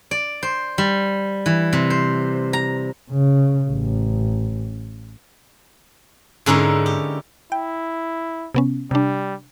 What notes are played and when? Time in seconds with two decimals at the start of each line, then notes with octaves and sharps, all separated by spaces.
0.11 D5
0.43 C5
0.78 G3
1.46 E3
1.73 C3
1.90 C5
2.53 A#5
3.11 C#3
3.70 A1
6.46 G#2 D3 C#4 D#4 E4 A#4
6.86 G4
7.52 E4 G5
8.54 C3 B3 C#4
8.91 C3 G3 D4